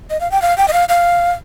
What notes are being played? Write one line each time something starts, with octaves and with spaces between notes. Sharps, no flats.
D#5
F5
G5
F5
G5
D#5
F5
F5